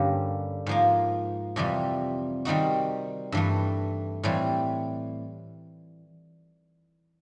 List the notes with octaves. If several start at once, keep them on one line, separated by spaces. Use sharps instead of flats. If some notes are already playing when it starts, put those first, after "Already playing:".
Already playing: G2 D3 G3 A#3 C#4
G#2 F3 A#3
F2 C3 E3 G3
D#3 G3 C4 D#4 F#4
G2 E3 A3
A2 E3 G3 C4